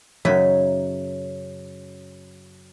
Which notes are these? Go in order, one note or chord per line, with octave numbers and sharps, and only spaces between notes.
F#2 C#3 F#3 D#4 E5 B5